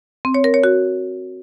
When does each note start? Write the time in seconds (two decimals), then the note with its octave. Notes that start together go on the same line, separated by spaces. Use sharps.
0.25 C4
0.34 C#5
0.44 A#4
0.54 C#5
0.64 F#4